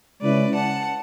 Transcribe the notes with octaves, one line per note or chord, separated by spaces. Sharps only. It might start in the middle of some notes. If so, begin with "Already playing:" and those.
C#3 G#3 C#4 E4 B4 D5
F#5 A5